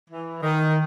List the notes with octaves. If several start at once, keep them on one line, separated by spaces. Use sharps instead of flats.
E3
D#3